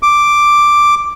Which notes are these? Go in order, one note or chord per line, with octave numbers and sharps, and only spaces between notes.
D6